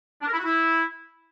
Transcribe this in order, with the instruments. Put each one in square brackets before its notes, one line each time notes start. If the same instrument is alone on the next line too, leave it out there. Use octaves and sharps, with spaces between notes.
[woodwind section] D4
A#4
E4
F#4
E4